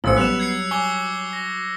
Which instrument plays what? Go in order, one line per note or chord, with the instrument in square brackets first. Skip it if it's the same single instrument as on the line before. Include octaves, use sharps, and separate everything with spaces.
[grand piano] A1 [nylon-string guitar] F4 C5 [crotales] E6 A6 C#7
[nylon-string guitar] F#3 G3 [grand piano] B3 E7 [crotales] F#6 B6 F7
[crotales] G#6 C7 C#7
[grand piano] G#5 [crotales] C#6 D6 G7
[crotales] A#6